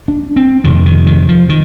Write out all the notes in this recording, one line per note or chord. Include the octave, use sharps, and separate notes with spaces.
D4
C4
F2 C3 D#3
D#3
D#3
F3
D#3